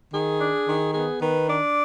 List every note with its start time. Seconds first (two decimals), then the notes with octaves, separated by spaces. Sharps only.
0.13 D#3 G#4
0.40 D4
0.67 D#3
0.94 B3 G#4
1.22 D#3 B4
1.49 D4 D5